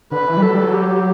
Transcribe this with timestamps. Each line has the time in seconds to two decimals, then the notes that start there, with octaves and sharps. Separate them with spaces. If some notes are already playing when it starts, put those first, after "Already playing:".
0.12 D3 B4
0.27 E3
0.37 G3
0.42 F#3 A4
0.53 G3
0.64 F#3
0.73 G4